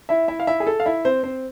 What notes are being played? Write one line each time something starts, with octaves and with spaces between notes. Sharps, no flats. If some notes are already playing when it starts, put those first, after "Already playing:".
E4 E5
E4 E5
F5
E4 E5
G#4
A4
F5
E4 E5
C4 C5
C4 C5